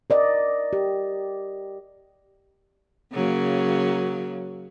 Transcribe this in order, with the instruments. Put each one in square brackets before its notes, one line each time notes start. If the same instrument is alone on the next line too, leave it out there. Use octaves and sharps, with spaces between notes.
[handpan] A#4 D5 D#5
G4
[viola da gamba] C#3 F#3 A#3